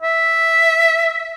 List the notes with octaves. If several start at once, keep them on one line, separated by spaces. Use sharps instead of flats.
E5